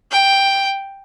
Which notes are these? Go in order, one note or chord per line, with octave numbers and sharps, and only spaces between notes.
G5